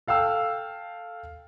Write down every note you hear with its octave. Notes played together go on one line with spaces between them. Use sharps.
A4 F5 G5 E6